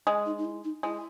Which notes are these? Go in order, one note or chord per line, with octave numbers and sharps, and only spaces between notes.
G#3
D#4
D#4
E4
D#4
G#3 E4